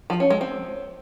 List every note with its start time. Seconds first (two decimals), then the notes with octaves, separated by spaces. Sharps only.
0.10 F3
0.20 C#4
0.30 G#3
0.41 C4